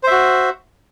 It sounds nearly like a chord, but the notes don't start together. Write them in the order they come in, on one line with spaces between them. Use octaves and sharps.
C5 E5 F#4